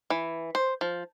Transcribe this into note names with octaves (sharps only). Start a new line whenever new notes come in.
E3
C5
F3